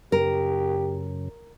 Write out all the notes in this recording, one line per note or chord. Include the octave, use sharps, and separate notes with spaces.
F#2 C#3 G4 A#4